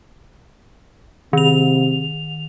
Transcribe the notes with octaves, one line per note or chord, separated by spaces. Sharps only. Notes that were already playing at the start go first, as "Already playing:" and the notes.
C3 D#3 F7